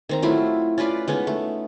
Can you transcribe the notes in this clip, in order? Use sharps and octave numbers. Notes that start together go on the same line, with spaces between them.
D#3 C4 A#5
F#3 A3 E4 F4
C#4 F4 B4 D5
G#3 B3 C#4 D#4
A3